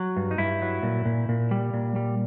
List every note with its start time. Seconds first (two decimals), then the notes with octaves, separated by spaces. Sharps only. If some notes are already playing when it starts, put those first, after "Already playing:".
Already playing: F#3
0.17 G2
0.31 D#4
0.38 G2 E4
0.62 F#3
0.83 A#2
1.06 A#2
1.29 A#2
1.51 G3
1.74 A#2
1.96 G3